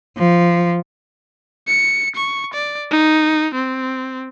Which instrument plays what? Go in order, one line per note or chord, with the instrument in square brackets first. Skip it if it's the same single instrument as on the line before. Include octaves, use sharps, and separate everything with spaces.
[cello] F3
[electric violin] C#7
C#6
D5
D#4
C4